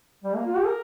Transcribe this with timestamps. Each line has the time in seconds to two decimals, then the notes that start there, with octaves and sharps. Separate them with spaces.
0.24 G3
0.35 A#3
0.46 F4
0.57 G4
0.66 A#4